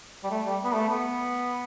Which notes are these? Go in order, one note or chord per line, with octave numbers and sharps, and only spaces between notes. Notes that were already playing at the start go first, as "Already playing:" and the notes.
G3
A3
G3
B3
A3
B3